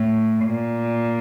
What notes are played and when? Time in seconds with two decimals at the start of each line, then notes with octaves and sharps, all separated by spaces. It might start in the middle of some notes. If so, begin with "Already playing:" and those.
Already playing: A2
0.45 A#2